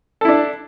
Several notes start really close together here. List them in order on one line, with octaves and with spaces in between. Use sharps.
A4 E4 D4